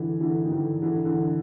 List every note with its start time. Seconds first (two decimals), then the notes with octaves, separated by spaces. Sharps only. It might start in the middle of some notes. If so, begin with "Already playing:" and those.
Already playing: D3 E3
0.20 D3 E3
0.44 D#3
0.51 D3 E3
0.82 D3 E3
1.05 D3 E3